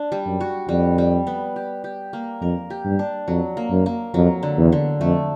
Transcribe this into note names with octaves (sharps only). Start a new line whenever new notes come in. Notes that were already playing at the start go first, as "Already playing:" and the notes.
Already playing: D4
G3
F#2
F#4
F2 G3
G3
B3
G4
G4
A#3
F2 A#4
G4
G2
D4
F2 F#3
A#3
F#2
A#3
F2 F#3
D3
E2
D3
F2 A3